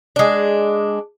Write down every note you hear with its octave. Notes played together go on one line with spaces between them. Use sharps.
G#3 D4